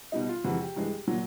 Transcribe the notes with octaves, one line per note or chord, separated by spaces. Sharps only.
B2 G3 D#4
F4
F2 C3 E3 G#3 F#4
G4
G2 E3 G#3
A#2 F#3